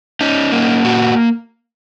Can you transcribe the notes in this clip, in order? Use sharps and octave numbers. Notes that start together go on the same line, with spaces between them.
C#4 D#4
A#3
A#2 F#4